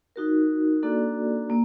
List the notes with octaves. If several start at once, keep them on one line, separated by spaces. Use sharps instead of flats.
D#4 F#4 A#4
A#3 D4 F#4 A4 D5
A#3